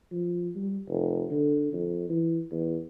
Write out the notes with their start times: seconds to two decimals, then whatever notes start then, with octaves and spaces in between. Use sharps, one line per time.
0.12 F3
0.56 G3
0.89 F1
1.30 D3
1.73 F2
2.09 E3
2.51 E2